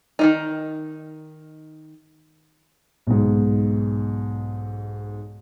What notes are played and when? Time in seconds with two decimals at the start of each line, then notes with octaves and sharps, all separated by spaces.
0.19 D#3 F3 D#4
3.07 B1 G#2